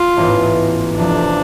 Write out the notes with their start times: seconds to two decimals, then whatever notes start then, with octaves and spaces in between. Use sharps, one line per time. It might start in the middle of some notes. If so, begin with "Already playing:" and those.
Already playing: F4
0.17 A1 G#2 E3 B3
0.97 F1 F2 C3 F3 A3 D4